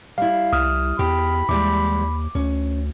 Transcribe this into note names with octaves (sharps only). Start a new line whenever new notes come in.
G3 E4 F5
C2 D#6 F6
E2 G4 B5
D#2 E3 G3 G#3 D6
D2 C#4